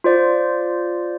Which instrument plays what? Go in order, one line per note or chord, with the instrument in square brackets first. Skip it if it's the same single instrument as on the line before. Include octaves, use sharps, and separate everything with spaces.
[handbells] F4 C5 D5